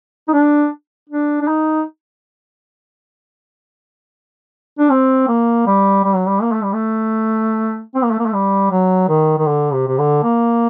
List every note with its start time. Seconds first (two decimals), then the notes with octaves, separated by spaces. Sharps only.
0.28 D#4
0.33 D4
1.09 D4
1.41 D4
1.48 D#4
4.79 D4
4.90 C4
5.28 A#3
5.66 G3
6.04 G3
6.15 F#3
6.26 G3
6.42 A#3
6.52 A3
6.63 G3
6.73 A3
7.95 C4
8.03 A#3
8.11 A3
8.19 A#3
8.26 A3
8.33 G3
8.71 F#3
9.08 D#3
9.38 D#3
9.47 D3
9.73 C3
9.88 C3
9.98 D3
10.23 A#3